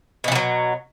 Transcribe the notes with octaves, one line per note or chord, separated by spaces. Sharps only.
B2 E3 F#3 G3